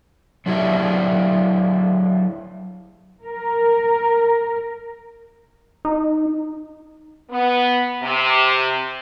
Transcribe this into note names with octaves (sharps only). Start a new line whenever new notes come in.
F#3 D4 E4 G4 D5 E5
A#4
D#4
B3
C3